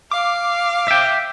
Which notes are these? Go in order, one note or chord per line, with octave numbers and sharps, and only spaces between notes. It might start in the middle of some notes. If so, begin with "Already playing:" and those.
F5 D6
E5 G5